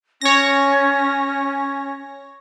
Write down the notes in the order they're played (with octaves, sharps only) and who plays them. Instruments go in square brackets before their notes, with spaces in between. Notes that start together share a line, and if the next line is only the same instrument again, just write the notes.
[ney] C#4 [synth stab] C#5 A#6